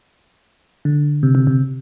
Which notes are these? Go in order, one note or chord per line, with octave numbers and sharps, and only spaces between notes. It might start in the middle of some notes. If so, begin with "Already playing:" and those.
D3
C3
C3
C3